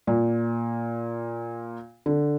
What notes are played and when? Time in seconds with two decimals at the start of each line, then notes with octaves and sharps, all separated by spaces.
0.07 A#2
2.06 D3